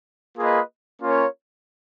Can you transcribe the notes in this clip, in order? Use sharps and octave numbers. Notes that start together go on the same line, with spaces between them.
A#3 F4 G#4 B4 D#5
A#3 C#4 F4 A#4 C#5